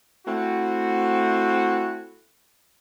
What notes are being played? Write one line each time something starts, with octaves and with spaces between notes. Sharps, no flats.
A3 C4 E4 F#4